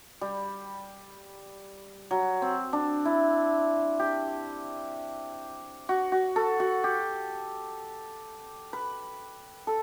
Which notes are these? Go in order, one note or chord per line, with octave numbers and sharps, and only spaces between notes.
G3
F#3
C4
D4
E4
G4
F#4
F#4
A4
F#4
G4
B4
A4